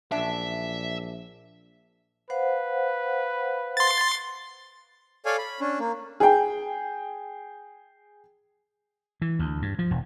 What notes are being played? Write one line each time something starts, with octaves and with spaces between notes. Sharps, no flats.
A#1 F#2 D4 E5
B4 C5 F5 F#5
C6 A6
A4 C#5 D5 F5 G#5
B5
C#4 D4
A#3
G#4 G5
E3
D2
G2
F3
E1